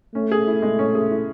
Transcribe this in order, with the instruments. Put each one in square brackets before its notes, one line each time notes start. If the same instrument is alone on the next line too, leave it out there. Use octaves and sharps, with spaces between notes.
[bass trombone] A3 [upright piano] C#4
[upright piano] G#4
E4
G#3
C#4
G#4
E4